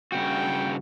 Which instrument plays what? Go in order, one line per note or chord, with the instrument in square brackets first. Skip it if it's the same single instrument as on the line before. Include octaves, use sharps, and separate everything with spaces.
[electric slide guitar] G2 C#3 F#4 [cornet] G5